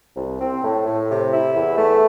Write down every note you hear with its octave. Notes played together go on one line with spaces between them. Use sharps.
C2
C4
A2
A2
C3
E4
E2
A3